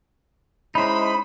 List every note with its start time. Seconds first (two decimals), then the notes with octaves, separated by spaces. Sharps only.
0.75 G#3 C#4 D#4 E4 C5 B5